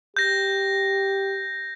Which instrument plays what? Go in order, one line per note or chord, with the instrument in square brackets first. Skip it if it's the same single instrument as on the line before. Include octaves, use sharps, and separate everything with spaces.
[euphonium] G4 [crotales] G6 A#6